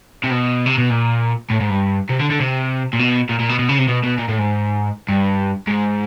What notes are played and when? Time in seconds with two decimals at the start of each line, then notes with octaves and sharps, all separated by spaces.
0.24 C3
0.30 B2
0.66 C3
0.78 B2
0.90 A#2
1.50 A2
1.60 G#2
1.70 G2
2.09 C3
2.19 D3
2.30 D3
2.39 C3
2.93 A#2
2.99 B2
3.29 A#2
3.39 A#2
3.49 B2
3.59 B2
3.69 C#3
3.79 C3
3.88 B2
4.04 B2
4.18 A#2
4.29 A2
4.39 G#2
5.08 G2
5.68 G#2